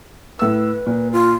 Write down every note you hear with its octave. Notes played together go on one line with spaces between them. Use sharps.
A2 B4 E6
A#2
F4